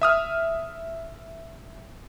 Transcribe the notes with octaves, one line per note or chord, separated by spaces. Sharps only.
E5 D#6 F6